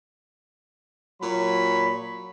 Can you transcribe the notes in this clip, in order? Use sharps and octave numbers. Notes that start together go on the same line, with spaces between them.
A#2 F#3 C#5 B5